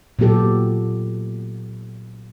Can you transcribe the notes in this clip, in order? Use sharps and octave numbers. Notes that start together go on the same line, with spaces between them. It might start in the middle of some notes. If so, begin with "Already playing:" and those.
A#2 F#3 B3 G4 A4